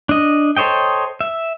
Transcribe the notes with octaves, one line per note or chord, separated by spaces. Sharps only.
D4 D#5
A4 C5 C#5 D#5 G5
E5